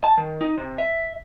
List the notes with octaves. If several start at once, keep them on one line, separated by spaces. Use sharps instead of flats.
A5
D#3
D#4
C3
E5